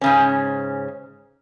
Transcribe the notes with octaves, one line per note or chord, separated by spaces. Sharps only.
G#2 C#3 C#4